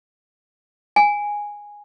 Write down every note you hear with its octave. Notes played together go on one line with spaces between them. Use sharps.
G#5